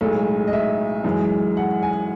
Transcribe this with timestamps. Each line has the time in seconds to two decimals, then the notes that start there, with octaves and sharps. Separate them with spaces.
0.01 B1 A2 G#3 A4
0.48 D#5
0.53 E5
1.04 F#2 E3 G#3
1.57 F#5
1.83 G#5